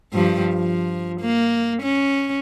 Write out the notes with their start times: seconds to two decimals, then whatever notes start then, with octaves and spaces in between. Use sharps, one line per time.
0.13 G2 F3 G3
0.56 F3
1.21 A#3
1.83 C#4